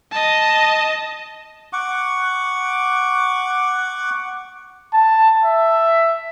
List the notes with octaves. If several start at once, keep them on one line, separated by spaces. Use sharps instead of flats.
D#5 A5
F#5 C#6 D6
A5
E5